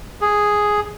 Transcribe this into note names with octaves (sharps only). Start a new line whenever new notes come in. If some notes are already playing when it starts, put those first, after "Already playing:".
G#4